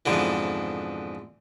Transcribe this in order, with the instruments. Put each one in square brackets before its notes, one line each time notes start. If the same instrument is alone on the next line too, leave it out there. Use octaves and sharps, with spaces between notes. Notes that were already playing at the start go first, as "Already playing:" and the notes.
[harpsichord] F2 G#2 B2 D3 E3